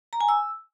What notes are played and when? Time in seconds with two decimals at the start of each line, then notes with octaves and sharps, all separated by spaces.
0.13 A#5
0.21 G#5
0.28 E6